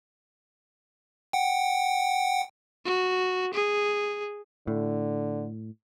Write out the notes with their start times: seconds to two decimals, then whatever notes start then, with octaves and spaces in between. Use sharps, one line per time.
1.33 F#5 G5
2.85 F#4
3.54 G#4
4.67 A2 D3